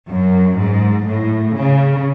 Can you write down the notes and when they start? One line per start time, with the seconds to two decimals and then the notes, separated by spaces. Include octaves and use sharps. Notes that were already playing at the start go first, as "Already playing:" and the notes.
0.11 F#2
0.60 G#2
1.08 A2
1.56 C#3